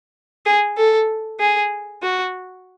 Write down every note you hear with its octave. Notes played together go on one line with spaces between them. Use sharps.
G#4
A4
G#4
F#4